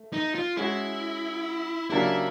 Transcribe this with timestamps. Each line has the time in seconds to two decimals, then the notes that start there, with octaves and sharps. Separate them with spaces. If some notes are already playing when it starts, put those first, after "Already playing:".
Already playing: A3
0.13 D#4
0.35 F4
0.57 G#3 C#4 E4 F#4
1.90 C#3 F#3 A#3 D4 E4 G4